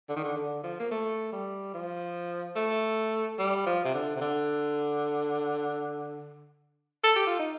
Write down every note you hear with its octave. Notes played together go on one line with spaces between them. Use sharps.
D3
D#3
D3
D3
F3
A#3
A3
G3
F3
A3
G3
F3
C3
D3
C3
D3
A4
G4
F4
D#4